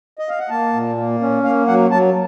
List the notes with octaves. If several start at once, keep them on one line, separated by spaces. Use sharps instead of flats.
D#5
F5
F#5
A#3 A5
A#2
A#3
C#4
A#3 F5
F#3 F#5
F#3 A5